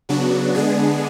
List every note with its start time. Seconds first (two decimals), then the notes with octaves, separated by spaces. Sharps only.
0.09 C#3 F#3 B3 D4 F#4
0.55 D3 G#3 B3 D4 G#4